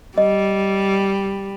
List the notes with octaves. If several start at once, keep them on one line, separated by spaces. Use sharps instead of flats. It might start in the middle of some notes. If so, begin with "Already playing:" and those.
G3 D#5